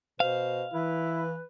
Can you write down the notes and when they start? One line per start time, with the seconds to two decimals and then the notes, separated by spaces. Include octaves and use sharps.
0.20 B2 C5 F5
0.74 E3 E4 B4